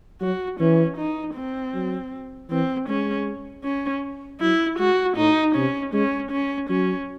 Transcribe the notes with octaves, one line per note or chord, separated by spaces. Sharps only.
F#3 F#4
E3 C#4
D#4
C4
F#3
E3 C4
G#3 C#4
C#4
F#3 E4
G#3 F#4
A2 D#4
C3 C#4
G#3 C#4
C#4
F#3 C#4